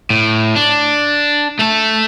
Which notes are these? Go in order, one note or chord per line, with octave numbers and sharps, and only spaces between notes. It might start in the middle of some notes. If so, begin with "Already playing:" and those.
A2
D4
A3 A4